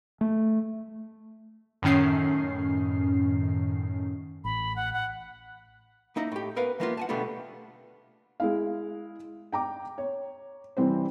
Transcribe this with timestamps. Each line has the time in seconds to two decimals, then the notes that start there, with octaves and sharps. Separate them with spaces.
0.21 A3
1.82 F#2 A2 D#3 C#4 C7
4.44 A1 B5
4.76 F#5
4.93 F#5
6.16 A#3 D#4 E4 D#5
6.32 A2 G4
6.56 B3 A#4 B4 F5 F#5
6.80 E3 F3 A#3 B3 D#4 F4
6.97 F#5 G#5 A5
7.09 B2 D3 G3 A3 B3 F4
8.40 G#3 E4 F5
9.52 G5 A#5 D6
9.98 C#5
10.77 C3 E3 G3 C4 C5